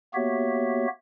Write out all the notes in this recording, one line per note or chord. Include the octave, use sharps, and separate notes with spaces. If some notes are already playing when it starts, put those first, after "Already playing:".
A#3 B3 F#4 G4 C#5 E5